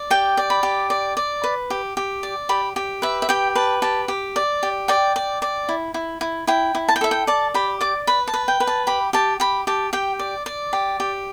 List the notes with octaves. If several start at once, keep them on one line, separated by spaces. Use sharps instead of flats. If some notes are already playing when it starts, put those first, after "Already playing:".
Already playing: D5
G4 G5
D5
B5
G4
D5
D5
B4
G4
G4
D5
G4 B5
G4
B4 E5
E5
G4 G5
B4 A5
G4 A5
G4
D5
G4
D5 G5
D5
D5
E4
E4
E4
E4 G5
E4
A5
G5
A4 E5
G5
D5 A5
G4 B5
D5 D6
B4 B5
A5
B4
G5
B4
A5
G4 B5
G4 A5
G4 B5
G4 A5
G4 G5
D5
D5
G4
G4